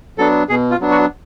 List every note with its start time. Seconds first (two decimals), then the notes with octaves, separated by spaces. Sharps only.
0.18 F#3 B3 D4 A4
0.49 B2 G#4
0.71 F4
0.81 F#3 B3 D4
0.91 F#4